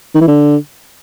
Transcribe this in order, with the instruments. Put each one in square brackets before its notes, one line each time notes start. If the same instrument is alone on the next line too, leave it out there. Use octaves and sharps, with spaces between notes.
[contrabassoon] D#3
E3
D3